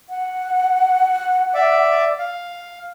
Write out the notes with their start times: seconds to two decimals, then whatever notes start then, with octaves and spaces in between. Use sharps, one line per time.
0.10 F#5
1.54 D5 E5 D6
2.19 F5